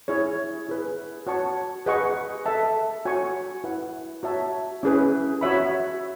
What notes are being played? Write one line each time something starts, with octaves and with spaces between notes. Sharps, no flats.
E4 G#4 C#5
E4 G#4 B4
F#4 C#5 F#5 A5 C#6
G#4 B4 D#5 F#5 C#6
A4 E5 A5
F#4 C#5 G#5 C#6
E4 B4 F#5
F#4 C#5 E5 A5
C#4 E4 G#4 B4
F#4 C#5 E5 B5